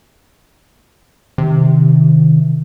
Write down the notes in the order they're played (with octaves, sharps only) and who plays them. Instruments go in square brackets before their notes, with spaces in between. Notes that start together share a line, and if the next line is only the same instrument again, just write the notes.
[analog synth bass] C3 [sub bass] D#3